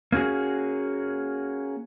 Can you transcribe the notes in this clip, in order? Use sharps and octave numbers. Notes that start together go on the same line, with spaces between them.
A#3 C#4 F#4 G#4